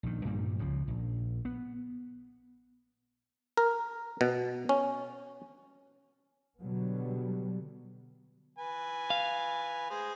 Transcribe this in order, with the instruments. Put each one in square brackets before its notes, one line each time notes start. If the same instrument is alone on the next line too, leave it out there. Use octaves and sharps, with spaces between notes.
[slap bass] A#1 D#3
G2 A#2 D#3 G3
C#2 C#3 F3
A#1
B3
[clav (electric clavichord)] A#4
B2
C#4
[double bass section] B2 D3 F#3 G3 B3
[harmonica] B4 G#5
[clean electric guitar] F5
[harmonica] G#4 C5